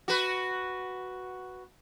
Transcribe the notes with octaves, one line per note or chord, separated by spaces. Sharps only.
F#4 B4